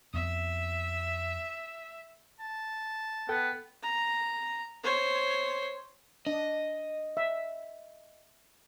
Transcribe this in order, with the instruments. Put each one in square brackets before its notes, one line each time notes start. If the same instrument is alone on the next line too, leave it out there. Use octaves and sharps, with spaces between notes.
[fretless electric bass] F2 B3 [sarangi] E5
[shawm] A5
[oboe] B3 [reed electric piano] A4 G5
[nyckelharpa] A#5
C5 C#5
[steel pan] D4 [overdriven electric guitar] D#5
[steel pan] E5